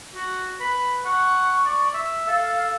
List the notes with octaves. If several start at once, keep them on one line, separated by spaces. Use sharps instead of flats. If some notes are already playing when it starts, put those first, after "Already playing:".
F#4
B4
F#5 C#6
D5
E5
A4 F5